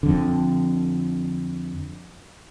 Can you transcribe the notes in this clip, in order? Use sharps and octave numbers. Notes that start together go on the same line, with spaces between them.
F2 D3